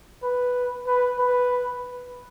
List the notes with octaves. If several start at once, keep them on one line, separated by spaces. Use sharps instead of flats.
B4
B4
B4